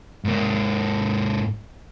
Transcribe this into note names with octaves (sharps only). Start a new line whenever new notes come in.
G#2 A#3